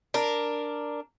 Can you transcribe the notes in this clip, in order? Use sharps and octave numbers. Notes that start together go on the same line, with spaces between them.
D4 A#4